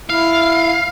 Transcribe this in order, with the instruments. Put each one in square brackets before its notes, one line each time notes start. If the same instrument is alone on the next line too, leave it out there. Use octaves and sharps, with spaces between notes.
[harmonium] E4 [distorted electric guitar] F5